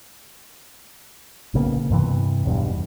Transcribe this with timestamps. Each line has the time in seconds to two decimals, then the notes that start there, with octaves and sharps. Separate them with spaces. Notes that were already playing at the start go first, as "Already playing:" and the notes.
1.54 A#1 C#3 A#3 B3
1.90 G2 C3 E3
2.45 E1 B1 E2 G2